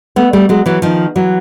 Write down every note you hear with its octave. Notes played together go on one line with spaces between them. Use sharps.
A3 B3
G3 A3
F#3 G#3
E3 F#3
D#3 F3
E3 F#3